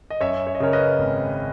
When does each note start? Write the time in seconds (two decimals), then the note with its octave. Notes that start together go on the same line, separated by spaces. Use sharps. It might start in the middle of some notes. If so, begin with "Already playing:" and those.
0.10 D#5
0.21 F#2 C#5 E5
0.47 C#5
0.55 D#5
0.60 C#3 A#4 C#5
0.73 B4 D#5
0.99 G#1